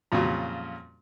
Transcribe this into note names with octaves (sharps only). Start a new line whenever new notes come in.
F2 A#2 C#3 F#3 G3 F4